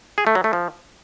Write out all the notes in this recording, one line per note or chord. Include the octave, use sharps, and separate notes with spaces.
G#4
A3
F#3
A3
F3